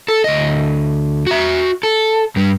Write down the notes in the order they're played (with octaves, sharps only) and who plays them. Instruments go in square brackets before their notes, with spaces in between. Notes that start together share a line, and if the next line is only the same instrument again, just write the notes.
[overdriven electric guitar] A4
D2 D#5
F#4 E5
A4
G2 G3